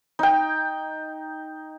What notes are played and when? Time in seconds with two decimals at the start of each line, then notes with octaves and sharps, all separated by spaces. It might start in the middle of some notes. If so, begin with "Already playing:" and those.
0.19 D#4 G5